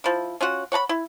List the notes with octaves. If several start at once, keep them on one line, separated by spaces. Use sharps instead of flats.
F3 E4
C#4 F4 F#4 F#5
C#5 F#5 A5 B5
E4